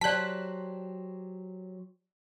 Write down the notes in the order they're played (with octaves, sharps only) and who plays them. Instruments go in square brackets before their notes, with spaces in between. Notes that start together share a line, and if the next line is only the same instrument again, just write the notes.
[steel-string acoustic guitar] F#3 G4 C5 [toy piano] D5 A5 [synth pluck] F#6 B6